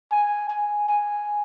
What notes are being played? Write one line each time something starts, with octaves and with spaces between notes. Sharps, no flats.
G#5
G#5
G#5